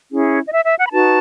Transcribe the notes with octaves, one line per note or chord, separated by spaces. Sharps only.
C#4 E4 G#4
D#5
E5
E5
F#5
B5
D#4 F#4 B4 A5